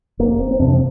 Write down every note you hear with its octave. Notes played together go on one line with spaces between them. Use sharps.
F1 A#3
C4
C4
F2 C3 D4
F3